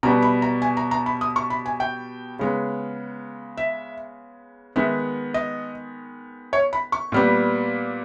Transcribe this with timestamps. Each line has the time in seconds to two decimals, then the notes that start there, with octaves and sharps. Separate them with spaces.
0.03 B2 G3 B3 A#5
0.22 B5
0.42 A#5
0.62 G#5
0.77 A#5
0.91 A#5
1.06 B5
1.21 D#6
1.36 C#6
1.50 B5
1.66 G#5
1.80 G5
2.39 C#3 G#3 B3
3.57 E5
4.76 D#3 G#3 B3 E5
5.34 D#5
6.53 C#5
6.73 B5
6.92 C#6
7.12 A#2 G3 B3